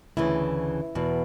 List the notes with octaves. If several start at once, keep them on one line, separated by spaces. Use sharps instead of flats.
D2 C#3 E3 E4
E2 B2